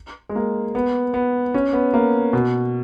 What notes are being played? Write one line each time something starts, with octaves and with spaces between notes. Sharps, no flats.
G#3
A#3
B3
B3
C#4
B3
A#3
B2